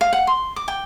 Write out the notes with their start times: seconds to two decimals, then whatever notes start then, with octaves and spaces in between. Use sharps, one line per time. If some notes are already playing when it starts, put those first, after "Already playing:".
0.01 F5
0.13 F#5
0.27 C6
0.56 D6
0.68 G5